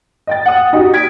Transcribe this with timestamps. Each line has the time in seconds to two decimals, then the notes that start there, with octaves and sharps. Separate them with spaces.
0.27 D#5 G5 A6
0.46 F#5 D#6
0.73 D#4 F#4 G4
0.94 G#6 B6 D7